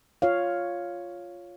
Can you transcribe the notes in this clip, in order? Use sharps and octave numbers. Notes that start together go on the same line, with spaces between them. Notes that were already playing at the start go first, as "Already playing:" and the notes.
F4 C#5 F5